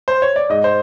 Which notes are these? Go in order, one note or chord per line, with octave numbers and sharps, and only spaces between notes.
C5
C#5
D5
G#2 D#5
C5